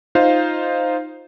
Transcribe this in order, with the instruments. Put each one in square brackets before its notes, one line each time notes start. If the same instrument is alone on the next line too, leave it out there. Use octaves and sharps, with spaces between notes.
[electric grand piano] D#4 F4 C5 F5